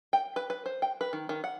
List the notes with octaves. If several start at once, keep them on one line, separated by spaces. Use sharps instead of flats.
G5
B4
B4
C5
G5
B4
D#3
D#3
F#5